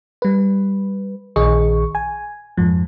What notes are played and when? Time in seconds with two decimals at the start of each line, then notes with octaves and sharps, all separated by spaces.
0.22 G3 B4
1.36 A#1 D#3 G#4 D#5 C#6
1.95 G#5
2.58 F2 G#2 F3